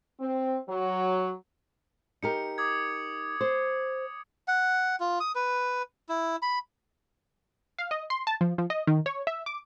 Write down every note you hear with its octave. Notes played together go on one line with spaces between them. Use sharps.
C4
F#3
D#4 G4 A#4 C#7
D6 D#6 G#6
C5
F#5
F4
D#6
B4
E4
B5
F5
D#5
C6
A5
F3
F3
D#5
D#3
C#5
E5
D6